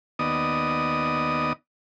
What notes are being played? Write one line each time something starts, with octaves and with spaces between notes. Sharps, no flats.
D#2 B3 D5 D#5 D#6